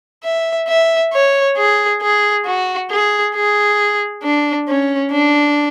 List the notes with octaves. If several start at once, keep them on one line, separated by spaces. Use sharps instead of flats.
E5
E5
C#5
G#4
G#4
F#4
G#4
G#4
D4
C#4
D4